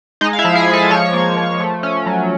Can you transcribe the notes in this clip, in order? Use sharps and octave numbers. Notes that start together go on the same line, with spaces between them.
G#3 D#4 D#5
F5
E4 E5
F3
G#4 G#5
G#3
A4 A5
F3 C#5 C#6
A#3
F3
A3
C#4
F#3